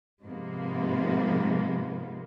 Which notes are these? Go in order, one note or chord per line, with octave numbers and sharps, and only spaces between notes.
G#2 C3 F3 A#3 B3